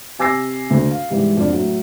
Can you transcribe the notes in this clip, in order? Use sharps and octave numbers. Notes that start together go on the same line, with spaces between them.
C3 G#5 D6 E6 A#6 C7
D2
F5
G#2 E3 G3
F2 D4 F4 D5
A2 F#3